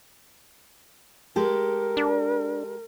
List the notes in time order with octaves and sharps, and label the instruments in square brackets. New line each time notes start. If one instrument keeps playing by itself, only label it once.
[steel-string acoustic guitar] G#3 G4 A4 [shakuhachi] A#4
[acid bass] D4